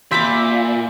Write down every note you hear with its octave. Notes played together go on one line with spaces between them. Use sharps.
A#2 E5 B5 C6 D6 G6 B6